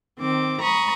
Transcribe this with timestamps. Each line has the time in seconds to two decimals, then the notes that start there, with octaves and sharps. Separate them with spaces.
0.19 D#3 C4 D6
0.61 A#5 B5 C#6 D#6